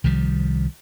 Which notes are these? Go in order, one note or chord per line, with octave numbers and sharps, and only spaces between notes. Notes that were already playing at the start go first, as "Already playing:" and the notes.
C2 D#3 F3 G3